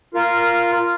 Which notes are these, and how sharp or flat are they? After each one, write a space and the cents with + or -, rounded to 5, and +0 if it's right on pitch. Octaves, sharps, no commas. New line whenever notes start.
F4 -10 A#4 +0